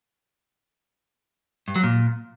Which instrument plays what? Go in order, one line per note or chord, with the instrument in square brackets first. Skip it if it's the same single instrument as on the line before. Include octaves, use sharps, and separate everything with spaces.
[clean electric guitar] G2
F#3
A#2